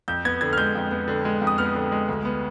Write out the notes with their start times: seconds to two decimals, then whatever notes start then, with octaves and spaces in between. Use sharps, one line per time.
0.08 F2 G6
0.25 B3 G#6
0.41 D3 G#6
0.53 F6
0.58 G#3 G6
0.75 F2
0.91 B3
1.08 D3
1.25 G#3
1.42 F2
1.47 D#6
1.58 B3 F6
1.75 D3
1.92 G#3
2.08 D2
2.25 B3